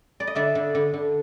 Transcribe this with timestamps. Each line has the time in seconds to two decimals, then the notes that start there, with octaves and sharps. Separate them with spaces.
0.20 D5
0.27 D#5
0.35 D3 D5 E5
0.55 D3
0.75 D3
0.94 D3